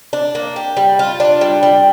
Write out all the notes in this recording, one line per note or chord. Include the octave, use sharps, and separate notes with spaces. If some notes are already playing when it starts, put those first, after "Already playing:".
D4
A#3
G4
G3
F4
D4
G3
G3